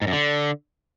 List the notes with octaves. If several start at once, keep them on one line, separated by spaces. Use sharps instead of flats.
G#2
F#2
D3